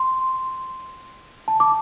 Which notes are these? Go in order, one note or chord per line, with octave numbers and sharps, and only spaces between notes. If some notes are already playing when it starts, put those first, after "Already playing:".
Already playing: C6
A5
D6